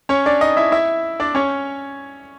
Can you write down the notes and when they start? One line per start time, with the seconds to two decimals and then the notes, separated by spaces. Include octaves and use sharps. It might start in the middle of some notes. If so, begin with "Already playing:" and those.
0.09 C#4 C#5
0.26 D4 D5
0.41 D#4 D#5
0.57 E4 E5
0.72 E4 E5
1.20 D4 D5
1.35 C#4 C#5